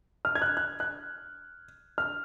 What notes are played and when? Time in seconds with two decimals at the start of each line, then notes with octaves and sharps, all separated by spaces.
0.25 F6
0.35 G#6
0.42 F#6
0.57 F#6
0.80 F#6
1.98 F6